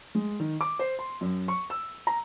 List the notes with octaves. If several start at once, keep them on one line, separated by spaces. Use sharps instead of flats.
G#3
D#3
D6
C5
C6
F#2
C#6
E6
A#5